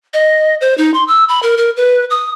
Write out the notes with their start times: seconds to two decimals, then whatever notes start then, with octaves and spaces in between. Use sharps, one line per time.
0.14 D#5
0.61 C5
0.78 D#4
0.94 C6
1.08 E6
1.29 B5
1.43 A#4
1.57 A#4
1.77 B4
2.10 D#6